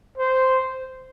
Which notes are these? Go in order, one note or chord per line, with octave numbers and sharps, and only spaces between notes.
C5